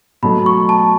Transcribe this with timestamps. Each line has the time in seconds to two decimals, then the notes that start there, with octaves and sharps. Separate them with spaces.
0.23 B2 F#3 A3 B5
0.46 C#6
0.69 A5